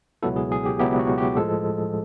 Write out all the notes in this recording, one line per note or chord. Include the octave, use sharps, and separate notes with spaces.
C#2 B2 F#3 B3 E4 A4
G#4
G#4
G4
C#2 B2 F#3 B3 E4 G4
F#4
G4
A2 F3 G#3 A4